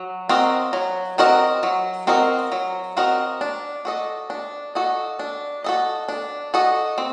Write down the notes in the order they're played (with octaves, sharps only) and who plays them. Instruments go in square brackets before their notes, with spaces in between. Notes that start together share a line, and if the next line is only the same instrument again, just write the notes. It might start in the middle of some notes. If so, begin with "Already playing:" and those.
Already playing: [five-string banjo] F#3
C4 F#4 A#4 D#5
F#3
C4 F#4 A#4 D#5
F#3
C4 F#4 A#4 D#5
F#3
C4 F#4 A#4 D#5
D4
F#4 A4 D#5
D4
F#4 A4 D#5
D4
F#4 A4 D#5
D4
F#4 A4 D#5
C4